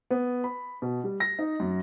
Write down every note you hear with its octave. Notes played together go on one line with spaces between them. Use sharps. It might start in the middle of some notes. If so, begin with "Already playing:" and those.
B3
B5
B2
G3
A#6
D#4
F#2